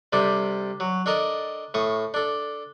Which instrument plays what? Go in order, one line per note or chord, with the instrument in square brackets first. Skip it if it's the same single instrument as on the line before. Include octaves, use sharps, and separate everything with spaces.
[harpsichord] C3 G3 D4 A4
F#3
D4 A4 A#4 D#5
A2 C#6 D#6
D4 A4